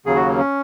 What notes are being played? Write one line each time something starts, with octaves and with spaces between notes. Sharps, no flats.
D#2 C#3 F#3 G#4
F#4
A#3
C#4